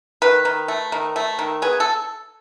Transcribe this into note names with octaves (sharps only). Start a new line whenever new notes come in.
D#3 B4
D#3
A3
D#3
A3
D#3
B3 G#4
A4